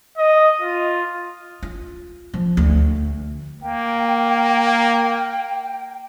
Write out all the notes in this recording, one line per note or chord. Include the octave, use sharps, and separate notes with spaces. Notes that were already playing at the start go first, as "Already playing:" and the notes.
D#5
F4
F4
F3
D2
A#3 G5